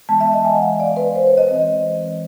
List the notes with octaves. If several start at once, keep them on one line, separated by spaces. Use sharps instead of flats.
E3 G#3 B3 A5
E5
D#5
G#5
F#5
F5
E5
D5
B4
C5
C#5
D#5
E3 G#3 C4